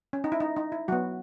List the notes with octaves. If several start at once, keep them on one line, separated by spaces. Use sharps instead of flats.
C#4
D#4
E4
D#4
D#4
E4
F#3 B3 F#4